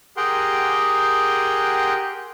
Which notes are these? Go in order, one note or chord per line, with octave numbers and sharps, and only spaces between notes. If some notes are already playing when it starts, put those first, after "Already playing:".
G4 G#4 A#4 F#5 G5 C6